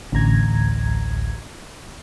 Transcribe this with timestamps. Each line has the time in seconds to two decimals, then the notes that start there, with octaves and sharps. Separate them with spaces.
0.12 A1 D2 A#5 G#6